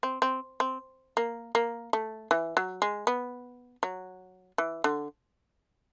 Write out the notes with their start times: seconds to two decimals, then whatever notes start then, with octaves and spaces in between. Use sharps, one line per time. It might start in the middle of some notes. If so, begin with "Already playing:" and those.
0.03 C4
0.22 C4
0.60 C4
1.17 A#3
1.55 A#3
1.93 A3
2.31 E3
2.57 F#3
2.82 G#3
3.07 B3
3.83 F#3
4.58 E3
4.84 D3